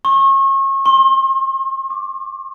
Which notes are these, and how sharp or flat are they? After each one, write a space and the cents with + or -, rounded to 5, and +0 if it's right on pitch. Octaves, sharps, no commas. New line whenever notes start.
C#6 -35
C6 +40
D6 -10